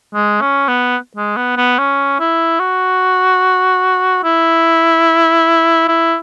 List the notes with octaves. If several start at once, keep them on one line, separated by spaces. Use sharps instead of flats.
G#3
C#4
B3
G#3
B3
B3
C#4
E4
F#4
E4
E4